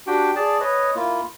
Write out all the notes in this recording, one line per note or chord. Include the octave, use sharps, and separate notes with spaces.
D4 F#4 G4 G5
G#4 D5 A5
B4 C#5 D#5
A#3 E4 F4